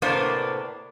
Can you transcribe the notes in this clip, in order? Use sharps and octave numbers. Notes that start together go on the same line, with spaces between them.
A2 C3 A#3 B3 D4 C5